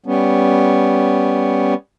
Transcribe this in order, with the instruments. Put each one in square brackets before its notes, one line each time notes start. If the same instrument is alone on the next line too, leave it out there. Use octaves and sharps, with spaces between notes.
[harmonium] G3 B3 C#4